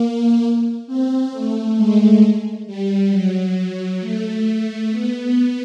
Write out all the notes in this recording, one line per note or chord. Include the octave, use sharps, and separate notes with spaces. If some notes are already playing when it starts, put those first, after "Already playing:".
Already playing: A#3
C4
A3
G#3
G3
F#3
A3
B3